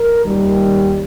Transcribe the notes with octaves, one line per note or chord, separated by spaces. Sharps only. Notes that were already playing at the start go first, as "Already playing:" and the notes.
Already playing: A#4
D#2 D#3 G3